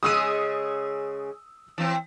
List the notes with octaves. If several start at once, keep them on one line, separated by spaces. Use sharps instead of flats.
C#3 G#3 G#4 D#6 E6 D#7
E3 C4